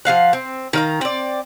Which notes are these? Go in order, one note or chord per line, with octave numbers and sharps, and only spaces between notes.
F3 A#3 F5 F#5
C4
D#3 F5 A#5
C4 D5